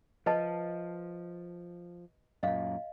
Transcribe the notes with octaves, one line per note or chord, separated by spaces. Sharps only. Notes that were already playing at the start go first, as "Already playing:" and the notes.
F3 B4 D#5 A5
F#2 A#2 D#5 F5